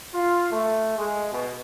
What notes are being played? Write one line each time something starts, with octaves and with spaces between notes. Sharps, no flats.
F4
A3
G#3
B2